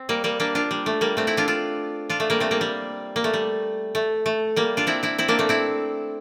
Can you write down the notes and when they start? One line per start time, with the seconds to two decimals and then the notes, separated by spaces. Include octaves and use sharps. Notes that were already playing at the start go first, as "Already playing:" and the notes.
Already playing: C4
0.09 G3 A#3
0.24 G3 A#3
0.40 A#3 D4
0.55 D4 F4
0.71 G3
0.86 A3
1.01 G3 A#3
1.17 A3 C4
1.27 C4 E4
1.37 D4 F4
1.48 D4 F4
2.10 D4 F4
2.20 A3
2.30 G3 A#3
2.40 A3 C4
2.51 G3 A#3
2.61 G3
3.16 A#3
3.24 A3
3.34 G3
3.95 A3
4.26 A3
4.56 G3 A#3
4.77 D4 F4
4.87 C4 E4
5.03 C4 E4
5.18 C4 E4
5.28 A#3 D4
5.39 A3 C4
5.49 C4 E4